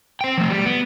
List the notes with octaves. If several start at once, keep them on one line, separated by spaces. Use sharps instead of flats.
C5 G5
F3 A3
G3
B3